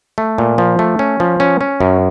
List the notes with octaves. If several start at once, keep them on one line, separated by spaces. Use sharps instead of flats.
A3
A#2
F3
A3
C#4
F3
C#4
C#4
F#2